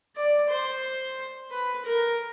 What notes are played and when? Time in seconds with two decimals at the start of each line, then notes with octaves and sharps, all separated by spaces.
0.15 D5
0.50 C5
1.51 B4
1.85 A#4